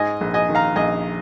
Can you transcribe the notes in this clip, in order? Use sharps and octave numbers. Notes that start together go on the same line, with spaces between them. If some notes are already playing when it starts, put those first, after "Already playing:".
Already playing: G#2 D#5 G#5
A#1
D#5 G#5
D#3
F5 A#5
A#1 D#5 G#5